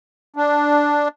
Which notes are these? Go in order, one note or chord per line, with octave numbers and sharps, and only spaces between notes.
D4